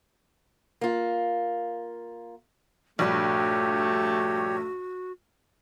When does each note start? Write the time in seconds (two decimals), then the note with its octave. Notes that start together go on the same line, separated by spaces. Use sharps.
0.81 A#3 F4
2.99 A#1 G2 G3 A3 F#4 G4 C#5